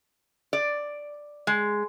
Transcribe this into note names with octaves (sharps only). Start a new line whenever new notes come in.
D5
G#3